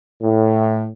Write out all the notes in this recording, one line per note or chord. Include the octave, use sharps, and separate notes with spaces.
A2